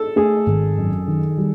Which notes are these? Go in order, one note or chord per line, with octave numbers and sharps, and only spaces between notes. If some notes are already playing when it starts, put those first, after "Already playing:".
Already playing: A4
A3 G#4
G#1
F#2
D#3
G3